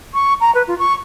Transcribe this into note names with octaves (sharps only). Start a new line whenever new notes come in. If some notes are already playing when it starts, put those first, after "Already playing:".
C#6
A#5
B4
F4
C#6